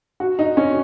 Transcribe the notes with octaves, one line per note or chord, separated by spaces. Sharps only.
F#4
D#4
C#4